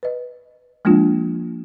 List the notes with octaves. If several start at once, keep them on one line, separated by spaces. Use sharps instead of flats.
B4 D#5
F3 G#3 A#3 D4 F4